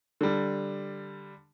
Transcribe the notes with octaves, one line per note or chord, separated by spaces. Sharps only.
D3 G3